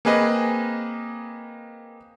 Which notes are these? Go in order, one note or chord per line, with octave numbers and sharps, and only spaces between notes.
A#3 C4 G#4 B4 D#5